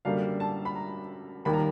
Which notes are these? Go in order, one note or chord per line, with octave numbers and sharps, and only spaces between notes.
F#2 D3 G3 A#3 F5
A5
B5
A#5
D#2 D#3 G3 A#3 B5
A#5